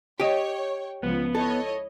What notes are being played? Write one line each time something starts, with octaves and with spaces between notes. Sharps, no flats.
G4 C#5 D#5 G5
C#2 F3 B3
E4 A4 C#5 D#5